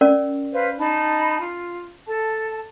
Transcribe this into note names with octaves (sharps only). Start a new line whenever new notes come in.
C#4 A#4 D5
B4 C5 F5
D#4 A5 B5
F4
A4 A5